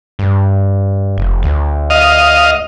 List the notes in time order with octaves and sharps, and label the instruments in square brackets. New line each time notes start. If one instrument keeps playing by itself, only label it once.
[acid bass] G2
F1
D2
[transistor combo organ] D#5 F5